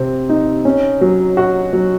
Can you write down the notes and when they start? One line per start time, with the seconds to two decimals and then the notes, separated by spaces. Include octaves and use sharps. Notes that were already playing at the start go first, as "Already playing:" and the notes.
Already playing: C3 C4
0.29 D#4
0.65 C#4
1.01 F#3
1.37 F#4
1.73 F#3